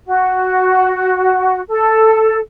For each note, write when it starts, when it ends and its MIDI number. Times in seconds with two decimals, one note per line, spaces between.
0.05 1.59 66
1.68 2.37 69